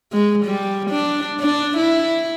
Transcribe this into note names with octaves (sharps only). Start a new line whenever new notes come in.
G#3
G3
D4
D4
E4